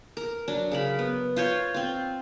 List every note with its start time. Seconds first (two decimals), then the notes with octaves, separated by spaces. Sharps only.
0.17 A#4
0.48 F#3 D4
0.72 C#3 A#4 B5
0.99 B3
1.36 F4 C5 C#5
1.74 C4 F4